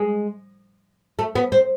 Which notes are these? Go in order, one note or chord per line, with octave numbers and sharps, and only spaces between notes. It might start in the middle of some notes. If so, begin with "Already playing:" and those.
Already playing: G#3
A3
B3
C4